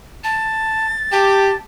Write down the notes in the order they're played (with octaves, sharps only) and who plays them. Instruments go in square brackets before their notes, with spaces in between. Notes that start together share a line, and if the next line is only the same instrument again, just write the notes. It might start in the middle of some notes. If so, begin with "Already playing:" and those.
[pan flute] A5 [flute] A6
[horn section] G4 [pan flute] A5